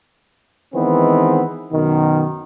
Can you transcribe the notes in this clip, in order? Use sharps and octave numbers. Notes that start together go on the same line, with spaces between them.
D#3 E3 G#3 B3 C4
F#2 B2 D#3